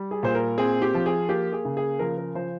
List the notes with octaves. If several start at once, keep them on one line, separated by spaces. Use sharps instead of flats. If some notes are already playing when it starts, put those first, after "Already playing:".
Already playing: G3
G#4
A#2 C5
A#4
C4 G#4
G4
F3
G#4
A#3 G4
G#4
C#3
G#4
F3 A#4
A#4
F3 C5